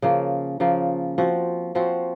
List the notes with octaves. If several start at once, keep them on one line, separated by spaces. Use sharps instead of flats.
C#3 F3 A#3
C#3 F3 A#3
F3 C4 F#4
F3 C4 F#4